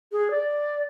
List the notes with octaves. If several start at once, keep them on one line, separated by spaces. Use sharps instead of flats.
G#4
D5